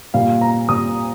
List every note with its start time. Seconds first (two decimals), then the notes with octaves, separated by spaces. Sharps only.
0.14 A#2 G3 F5
0.41 A#5
0.69 A#2 G3 D#6